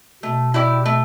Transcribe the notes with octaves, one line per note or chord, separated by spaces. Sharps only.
B2 A3
E4 G4 D5
A3